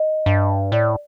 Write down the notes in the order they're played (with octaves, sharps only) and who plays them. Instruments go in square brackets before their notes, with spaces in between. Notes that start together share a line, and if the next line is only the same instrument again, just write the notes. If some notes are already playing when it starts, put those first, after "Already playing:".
Already playing: [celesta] D#5
[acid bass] G2
[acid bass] A2 [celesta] D5